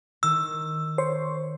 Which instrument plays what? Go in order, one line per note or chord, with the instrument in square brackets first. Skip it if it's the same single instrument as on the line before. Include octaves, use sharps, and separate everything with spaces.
[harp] D#3 [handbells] E6
[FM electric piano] C5 C#5